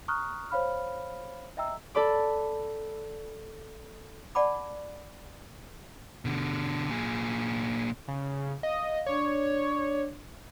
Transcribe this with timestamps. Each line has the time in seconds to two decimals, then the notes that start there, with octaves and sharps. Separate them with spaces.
0.08 A#5 C#6 D#6 F6 F#6
0.50 C5 C#5 F5 B5 F6
1.57 D#5 E5 G5 A#5 E6
1.95 A4 D5 B5 D6
4.35 D5 F#5 A5 B5 D6
6.25 B2 D3
6.90 A#2 G#4
8.08 C#3
8.63 D#5 F5
9.06 D4 C#5 D5 D6